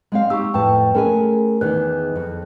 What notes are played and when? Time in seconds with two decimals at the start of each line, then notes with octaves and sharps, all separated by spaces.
0.12 G#3 C4 F5
0.30 D#4 G4 C#6 E6
0.54 F2 A2 B4 G5 A5
0.95 A3 C#4 G#4 A#4 G#5
1.61 E2 D#3 D#4 G#4 B4 F#6
2.16 F2